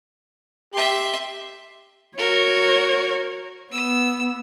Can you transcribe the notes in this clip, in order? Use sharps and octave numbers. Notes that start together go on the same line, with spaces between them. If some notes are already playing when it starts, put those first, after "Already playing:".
G4 E5 C6
F#4 A#4 C#5
B3 E6